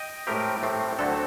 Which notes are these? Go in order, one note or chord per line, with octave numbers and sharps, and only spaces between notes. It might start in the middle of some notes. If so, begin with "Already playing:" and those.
Already playing: D#5 G5
A2 A3 C4 G4 A#4
A2 A3 C4
D2 D3 F#3 A3 C4 F#4 A4